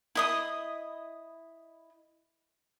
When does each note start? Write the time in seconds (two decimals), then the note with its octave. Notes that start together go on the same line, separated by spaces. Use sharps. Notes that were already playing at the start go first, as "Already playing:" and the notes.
0.15 E4 D#5 D#6